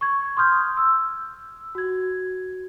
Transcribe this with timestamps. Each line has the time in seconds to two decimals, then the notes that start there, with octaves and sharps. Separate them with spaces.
0.01 C#6 G#6
0.37 C6 D#6 F6 G6
0.77 E6
1.75 F#4 G#6